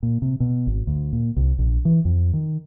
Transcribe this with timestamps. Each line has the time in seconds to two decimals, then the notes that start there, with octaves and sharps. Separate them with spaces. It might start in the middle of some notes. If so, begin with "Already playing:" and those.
0.03 A#2
0.22 C3
0.40 B2
0.67 G#1
0.87 D2
1.13 A#2
1.37 C2
1.59 A#1
1.85 E3
2.05 F2
2.33 D#3